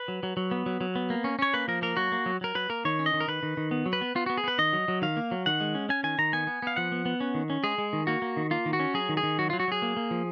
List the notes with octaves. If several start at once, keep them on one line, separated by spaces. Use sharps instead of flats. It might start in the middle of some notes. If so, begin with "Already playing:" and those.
Already playing: B4
F#3
F#3
F#3
B3
F#3
F#3
B3
A#3
C#4
C#4 C#5
A#3 B4
F3 A#4
A#3 A#4
F#3 F#4
A#3
F#3
F#3 A#4
F#3 B4
A#3 A#4
D#3 C#5
C#4
D#5
D#3
A#4
D#3 B4
D#3
D#3
B3
F#3
B4
B3
B3 F4
B3 F#4
G#4
B3 B4
D#3 D#5
F#3
F#3
D#3 F5
A#3
F#3
D#3 F#5
G#3
C#4
C#4 G#5
D#3 G#5
D#3 A#5
B3 G#5
B3
B3 F5
F3 F#5
B3
B3
C#4
D#3
C#4
G#3 G#4
G#3
D#3
A#3 F#4
A#3
D#3
A#3 F4
D#3
F#4
C#4
F#3 G#4
D#3
G#4
D#3
F#3 F#4
F#3 F4
F#4
F#3 G#4
A#3
A#3
F3